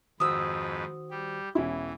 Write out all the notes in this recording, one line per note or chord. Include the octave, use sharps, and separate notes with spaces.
F2 G#2 D#3 F#4 B4 C5 D#6 E6
G3 G4
E1 E3 C#4 E4